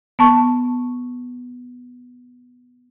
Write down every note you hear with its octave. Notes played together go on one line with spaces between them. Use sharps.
B3 A5 C#6